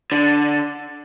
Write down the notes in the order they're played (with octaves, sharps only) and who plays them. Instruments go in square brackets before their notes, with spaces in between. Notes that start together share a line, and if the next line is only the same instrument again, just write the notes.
[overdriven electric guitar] D3